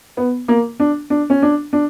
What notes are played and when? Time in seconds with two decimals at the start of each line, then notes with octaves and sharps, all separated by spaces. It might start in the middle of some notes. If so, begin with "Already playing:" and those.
0.17 B3
0.48 A#3
0.80 D4
1.10 D4
1.30 C#4
1.42 D4
1.73 D4